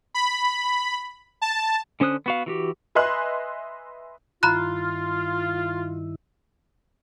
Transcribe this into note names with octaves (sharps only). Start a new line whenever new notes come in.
B5
A5
D3 C#4 C5 D#6 F#6
B3 F#4 F5
E3 F#4 G4
B4 D#5 E5 G#5 C6 F#6
G2 D#3 E4 F4 A#5 B5 F#6